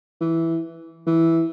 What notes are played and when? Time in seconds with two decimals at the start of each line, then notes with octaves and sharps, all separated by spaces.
0.20 E3
1.06 E3